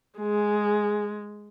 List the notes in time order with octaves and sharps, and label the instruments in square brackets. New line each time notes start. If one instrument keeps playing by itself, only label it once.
[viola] G#3 [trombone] G#4